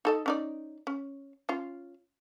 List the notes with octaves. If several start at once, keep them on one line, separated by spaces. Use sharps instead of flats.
D#4 A4 D#5
C#4 D#4 D5
C#4
C#4 F4